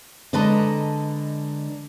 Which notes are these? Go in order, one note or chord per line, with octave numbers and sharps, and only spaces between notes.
D3 G#3 B4 D#5 A5 A#5